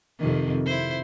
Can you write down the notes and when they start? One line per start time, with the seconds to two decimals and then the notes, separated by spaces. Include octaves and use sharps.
0.19 F2 C3 D#3
0.66 E4 C5